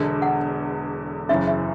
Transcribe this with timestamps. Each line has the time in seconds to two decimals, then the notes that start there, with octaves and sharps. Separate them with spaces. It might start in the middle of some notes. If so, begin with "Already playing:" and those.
Already playing: E1 E2 D3
0.22 F#5
1.29 F#1 F#2 C#3 E3 E5
1.47 E5